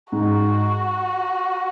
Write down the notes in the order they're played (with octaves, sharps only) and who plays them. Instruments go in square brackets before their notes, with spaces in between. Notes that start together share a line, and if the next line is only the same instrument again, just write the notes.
[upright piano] G#2 [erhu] F#4